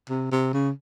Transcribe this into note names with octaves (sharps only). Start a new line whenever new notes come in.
C3
C3
C#3